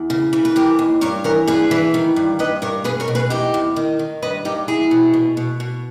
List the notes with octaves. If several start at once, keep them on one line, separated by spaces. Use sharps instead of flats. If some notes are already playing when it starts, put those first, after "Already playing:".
Already playing: E2
C#3
E3
B4
E3 G4 A#4
D#2
G2 A#4 C#5
E3 A#4 C#5
G2 G#4 B4
E3
D#3
G2
G2 B4 D#5
G2 A#4 C#5
B2 G#4 B4
A#4 C#5
B2
G#4 B4
E2 D#4 G4
E2
D#3
D#3
G2 B4 D#5
G2 D#4 G4
E2 E4 G#4
B2
B2
B2
B2